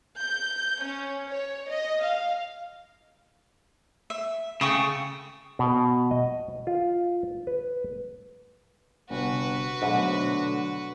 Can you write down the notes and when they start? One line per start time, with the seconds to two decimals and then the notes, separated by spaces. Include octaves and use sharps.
0.21 G6
0.82 C#4
1.29 C#5
1.69 D#5
2.03 F5
4.10 E5
4.61 C#3 A3 G5 C#6 D#6
5.59 B2
6.11 D#5
6.67 F4
7.47 B4
9.10 G1 C3 F#4 B4
9.82 G#2 B2 D3 F#3 A3